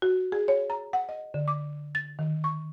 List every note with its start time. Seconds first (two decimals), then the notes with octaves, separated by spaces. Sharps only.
0.02 F#4
0.32 G#4
0.48 C#5
0.70 A#5
0.93 F#5
1.09 D#5
1.34 D3
1.48 D6
1.95 A6
2.19 D#3
2.44 C#6